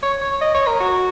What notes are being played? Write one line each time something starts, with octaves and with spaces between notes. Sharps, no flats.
C#5
C#5
D#5
C#5
A#4
F#4